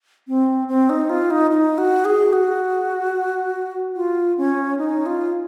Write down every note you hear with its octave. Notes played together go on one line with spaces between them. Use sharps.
C4
C4
D#4
F4
D#4
D#4
F#4
G#4
F#4
F4
C#4
D#4
F4